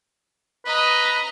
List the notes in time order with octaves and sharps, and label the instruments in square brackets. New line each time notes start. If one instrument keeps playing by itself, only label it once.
[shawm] B4 [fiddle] D#5 A#5